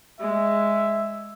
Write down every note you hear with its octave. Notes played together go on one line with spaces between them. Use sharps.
G#3 E5